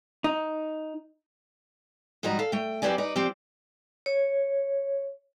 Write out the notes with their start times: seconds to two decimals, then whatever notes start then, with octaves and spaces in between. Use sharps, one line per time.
0.24 D#4
2.23 G#2 F3 G3 F#4 D#5 A#5
2.39 A4 F5
2.52 A3 G5
2.82 F#2 C4 G4 B4 D5 G#5
2.98 D#4 B4 D5
3.16 F3 C4 G4
4.06 C#5